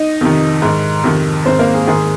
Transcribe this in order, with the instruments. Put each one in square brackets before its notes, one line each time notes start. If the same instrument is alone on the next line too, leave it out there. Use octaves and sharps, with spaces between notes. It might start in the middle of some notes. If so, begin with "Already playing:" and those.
Already playing: [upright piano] D#4 D#5
F2 C3 D#3
G#2 D#3
F2 C3 D#3
G#2 D#3 C4 C5
A#3 A#4
G#4
G#2 D#3 G#4